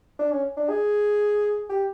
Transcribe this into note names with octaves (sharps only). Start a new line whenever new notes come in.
D4
C#4
D4
G#4
G4